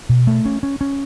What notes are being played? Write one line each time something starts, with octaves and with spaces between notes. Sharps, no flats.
B2
A3
C#4
C#4
C#4